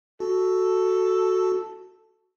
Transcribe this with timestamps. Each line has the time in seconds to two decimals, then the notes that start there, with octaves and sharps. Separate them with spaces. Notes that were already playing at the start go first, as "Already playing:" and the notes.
0.20 F#4 A4